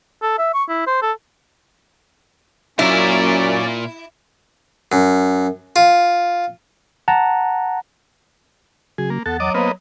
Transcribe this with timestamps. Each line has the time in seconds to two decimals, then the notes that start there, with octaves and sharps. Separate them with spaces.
0.22 A4
0.38 E5
0.54 C#6
0.69 E4
0.87 C5
1.02 A4
2.79 F#2 A#2 C#4 E4 A#4 D5
4.92 F#2
5.76 F4
7.08 F#5 A5 A#5
8.98 C#3 F#3 G#4
9.10 A#3
9.26 E2 B3 A4 F#5 A6
9.40 F#3 D#5 D6
9.55 A#3 B3 B4 C5 D#5 F5